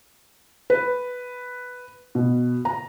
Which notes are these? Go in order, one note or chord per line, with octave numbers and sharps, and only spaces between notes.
B4
B2
A#5